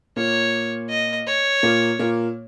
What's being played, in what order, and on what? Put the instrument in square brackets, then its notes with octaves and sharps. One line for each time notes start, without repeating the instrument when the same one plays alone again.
[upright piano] A#2 A#3 [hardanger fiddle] C#5
[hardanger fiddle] D#5
C#5
[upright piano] A#2 A#3
A#2 A#3